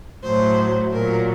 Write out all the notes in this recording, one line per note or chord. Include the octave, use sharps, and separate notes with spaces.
A2 F#3 C5
A#2 F#3 A#4